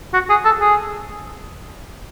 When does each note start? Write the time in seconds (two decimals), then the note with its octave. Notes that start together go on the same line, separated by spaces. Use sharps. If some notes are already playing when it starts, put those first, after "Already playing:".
0.14 F#4
0.30 G#4
0.45 A4
0.60 G#4